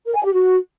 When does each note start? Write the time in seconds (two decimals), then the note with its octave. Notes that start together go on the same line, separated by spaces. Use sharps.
0.06 A#4
0.15 G#5
0.24 G4
0.33 F#4